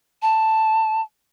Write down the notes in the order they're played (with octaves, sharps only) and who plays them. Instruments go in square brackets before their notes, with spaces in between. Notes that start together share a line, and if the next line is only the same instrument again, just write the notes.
[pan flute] A5